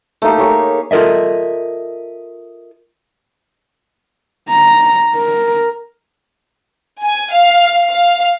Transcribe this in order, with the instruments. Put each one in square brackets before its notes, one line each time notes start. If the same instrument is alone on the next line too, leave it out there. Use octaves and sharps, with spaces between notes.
[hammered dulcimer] A3 A#3 D#4 G4
G4 G#4 C#5
[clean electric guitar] F4 A4 A#4 D#5 E5
[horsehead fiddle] A#5
A#4
[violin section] G#5
F5
F5